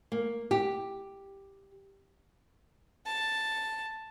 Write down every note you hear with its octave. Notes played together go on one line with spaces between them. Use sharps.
A#3
G4
A5